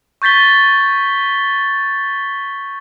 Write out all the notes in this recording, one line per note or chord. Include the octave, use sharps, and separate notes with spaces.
C#6 G6 A6 B6 G7